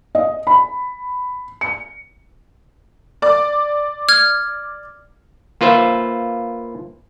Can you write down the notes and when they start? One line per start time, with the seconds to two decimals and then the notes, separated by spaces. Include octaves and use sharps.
0.15 D#5
0.47 B5
1.61 C#7
3.22 D5 D6
4.09 F6 G#6
5.61 A#3 F4 B4 C5 E5